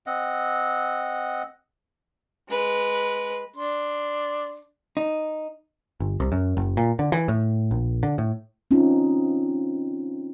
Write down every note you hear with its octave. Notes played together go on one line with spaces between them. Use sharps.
C4 D#5 F#5
G#3 B4
D4 C6
D#4
G1
C2
F#2
F#1
A#2
D3
E3
A2
A#1
D3
A2
C4 C#4 D#4 F4